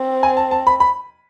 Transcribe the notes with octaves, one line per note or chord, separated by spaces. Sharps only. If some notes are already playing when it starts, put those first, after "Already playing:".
Already playing: C4
G#5
A5
A5
B5
B5